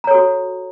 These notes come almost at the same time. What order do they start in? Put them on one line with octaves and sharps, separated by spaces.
A#5 C#5 A4 F#4